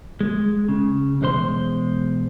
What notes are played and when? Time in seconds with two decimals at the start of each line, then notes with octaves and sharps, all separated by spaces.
0.21 G#3
0.69 C#3
1.21 B1 E2 G#3 C5 C6